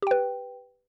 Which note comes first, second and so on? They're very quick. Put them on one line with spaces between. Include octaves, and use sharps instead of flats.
G4 G5 B4